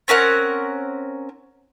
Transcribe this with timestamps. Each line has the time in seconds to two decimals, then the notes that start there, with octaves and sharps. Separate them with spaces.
0.08 C4 C#4 A#4 F#5